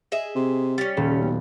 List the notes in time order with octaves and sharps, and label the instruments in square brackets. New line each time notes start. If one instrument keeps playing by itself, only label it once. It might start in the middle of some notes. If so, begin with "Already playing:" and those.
[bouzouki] G#4 D#5 E5
[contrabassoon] C3
[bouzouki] G3 C#4 [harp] A6
[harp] D#1 [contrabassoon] C#3
[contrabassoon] B1